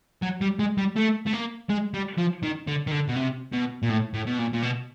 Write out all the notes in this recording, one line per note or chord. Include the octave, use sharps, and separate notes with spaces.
F#3
G3
G#3
G3
A3
A3
A#3
G#3
G3
F3
D#3
D3
D#3
D3
B2
C3
B2
A#2
A2
A2
B2
A#2
A#2
B2